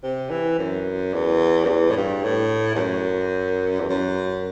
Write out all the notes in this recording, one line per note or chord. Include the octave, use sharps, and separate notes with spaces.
C3
E3
F#2
E2
F#2
E2
A2
G2
A2
E2
F#2
E2
F#2